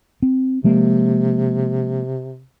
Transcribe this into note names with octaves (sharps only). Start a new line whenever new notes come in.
C4
C3 F3 G#3 A#3